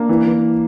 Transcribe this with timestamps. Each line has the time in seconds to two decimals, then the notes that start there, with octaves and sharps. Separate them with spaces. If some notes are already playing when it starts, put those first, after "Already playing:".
Already playing: A#3 D4
0.09 E3
0.26 E3